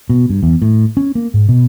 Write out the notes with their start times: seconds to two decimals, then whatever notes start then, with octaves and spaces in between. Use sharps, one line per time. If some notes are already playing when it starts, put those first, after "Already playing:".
0.09 B2
0.30 G2
0.43 E2
0.62 A2
0.97 C#4
1.15 A#3
1.34 G#2
1.49 B2